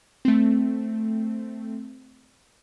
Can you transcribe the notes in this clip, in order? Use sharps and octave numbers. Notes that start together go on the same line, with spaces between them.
A3 C4